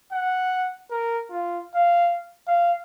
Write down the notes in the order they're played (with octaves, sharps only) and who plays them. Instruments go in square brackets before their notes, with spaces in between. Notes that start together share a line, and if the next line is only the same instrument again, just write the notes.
[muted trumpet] F#5
A#4
F4
F5
F5